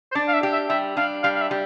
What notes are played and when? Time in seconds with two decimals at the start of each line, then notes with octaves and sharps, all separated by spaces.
0.12 C5
0.15 D4 D5
0.28 F5
0.33 E5
0.43 G4
0.52 E5
0.69 G3 E5
0.97 D4 F5
1.23 G3 F5
1.35 F5
1.41 E5
1.51 G3